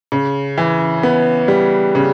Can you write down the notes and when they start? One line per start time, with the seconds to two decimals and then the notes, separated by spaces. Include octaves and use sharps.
0.12 C#3
0.58 E3
1.03 B3
1.48 G3
1.95 C#3